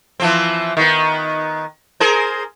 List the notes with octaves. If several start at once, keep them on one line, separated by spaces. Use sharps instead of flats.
E3 F3 C4
D#3 B3
G#4 A#4 C5